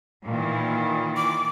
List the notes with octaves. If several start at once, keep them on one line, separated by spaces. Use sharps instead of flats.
A#2 D#3 E3
D6